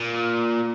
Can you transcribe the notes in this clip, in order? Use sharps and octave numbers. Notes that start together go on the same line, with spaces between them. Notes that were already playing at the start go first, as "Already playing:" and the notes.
Already playing: A#2